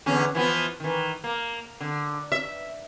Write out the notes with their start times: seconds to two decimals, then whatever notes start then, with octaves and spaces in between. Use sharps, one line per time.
0.06 E2 D3 C#4
0.35 E3 F3 B3
0.80 D#3 E3
1.24 A#3
1.81 D3
2.32 E5